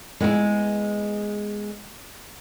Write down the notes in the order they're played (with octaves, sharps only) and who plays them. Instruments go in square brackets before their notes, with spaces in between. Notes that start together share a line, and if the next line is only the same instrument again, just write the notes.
[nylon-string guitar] G#3 B3 E4 G#4